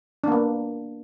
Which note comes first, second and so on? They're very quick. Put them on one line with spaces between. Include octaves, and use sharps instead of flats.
D4 A#3 B3